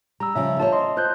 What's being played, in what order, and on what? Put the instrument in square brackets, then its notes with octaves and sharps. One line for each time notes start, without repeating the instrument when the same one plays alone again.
[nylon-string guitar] G3 [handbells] A#5 E6
[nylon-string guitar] C#3 F3 G3 [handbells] E5
[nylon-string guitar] F4 C5 C#5 [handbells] A5
[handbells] D#5 C6
[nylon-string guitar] F4 [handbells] C5 F#6 G6